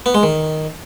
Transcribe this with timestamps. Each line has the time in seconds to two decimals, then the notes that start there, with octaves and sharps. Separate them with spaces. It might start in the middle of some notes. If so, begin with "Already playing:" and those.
0.06 B3
0.14 G#3
0.23 D#3